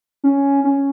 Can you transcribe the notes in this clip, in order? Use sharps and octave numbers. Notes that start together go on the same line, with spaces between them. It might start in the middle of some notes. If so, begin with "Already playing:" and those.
C#4
C#4